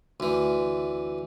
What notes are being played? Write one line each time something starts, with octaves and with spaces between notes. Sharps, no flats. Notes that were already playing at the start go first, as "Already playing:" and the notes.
D2 E3